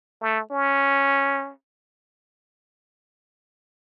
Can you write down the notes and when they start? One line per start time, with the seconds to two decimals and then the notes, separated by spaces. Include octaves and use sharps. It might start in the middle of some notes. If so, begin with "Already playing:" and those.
0.21 A3
0.51 C#4